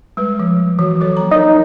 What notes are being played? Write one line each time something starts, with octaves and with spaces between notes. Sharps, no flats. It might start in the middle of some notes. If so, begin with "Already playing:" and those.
G3 G#3 B4
F3
E3 F#4
F#3 A4 C#5
A#3 A#5
D#4 A#4 C#5 D5